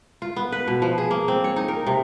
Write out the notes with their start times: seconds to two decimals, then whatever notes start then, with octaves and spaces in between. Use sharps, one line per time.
0.22 F4
0.36 B3
0.52 B4
0.68 B2
0.82 F3
0.98 G#4
1.11 A#3
1.28 C4
1.44 C#5
1.56 D#4
1.68 A#4
1.87 C3